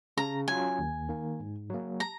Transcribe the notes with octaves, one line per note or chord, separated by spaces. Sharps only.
C#3 A#5
F#3 C#4 F4 G#5
D#2
D#3 A#3
G#2
F#3 A#3
A#5